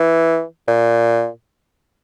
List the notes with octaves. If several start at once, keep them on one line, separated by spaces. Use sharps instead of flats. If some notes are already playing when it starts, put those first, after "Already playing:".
Already playing: E3
A#2